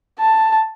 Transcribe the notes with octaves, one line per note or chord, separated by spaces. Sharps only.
A5